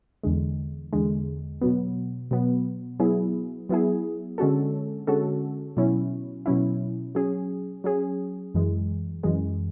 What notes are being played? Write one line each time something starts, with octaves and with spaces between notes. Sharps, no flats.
E2 D3 G#3
E2 D3 G#3
B2 F#3 B3
B2 F#3 B3
F#3 B3 E4 G#4
F#3 B3 E4 G#4
D3 G#3 C#4 F#4 A4
D3 G#3 C#4 F#4 A4
B2 F#3 C#4 E4
B2 F#3 C#4 E4
F#3 C#4 G#4
F#3 C#4 G#4
F#2 E3 G#3
F#2 E3 G#3